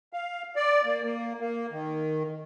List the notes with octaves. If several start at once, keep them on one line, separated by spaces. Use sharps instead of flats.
F5
D5
A#3
A#3
A#3
D#3